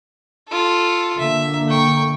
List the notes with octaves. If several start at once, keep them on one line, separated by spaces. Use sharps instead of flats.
F4 A4
D3 A#3 E5
G5 C#6